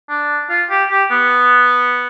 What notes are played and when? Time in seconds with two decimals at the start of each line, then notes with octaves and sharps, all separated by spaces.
0.10 D4
0.50 F4
0.70 G4
0.90 G4
1.11 B3